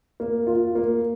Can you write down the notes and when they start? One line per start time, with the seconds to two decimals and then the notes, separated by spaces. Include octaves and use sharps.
0.20 A#3
0.47 F4
0.75 A#3